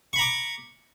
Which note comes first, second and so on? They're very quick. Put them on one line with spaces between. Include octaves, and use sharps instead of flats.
C#6 B5 A#5 D6